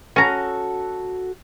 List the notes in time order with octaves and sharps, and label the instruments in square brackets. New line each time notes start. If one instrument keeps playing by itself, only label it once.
[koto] C#4 A#5 [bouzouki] F#4 A4